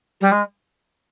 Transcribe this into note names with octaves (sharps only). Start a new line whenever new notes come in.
G3
G#3